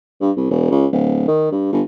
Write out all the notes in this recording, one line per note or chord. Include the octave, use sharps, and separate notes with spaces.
G2
C2
E1
C#2
D1
D#3
G2
G1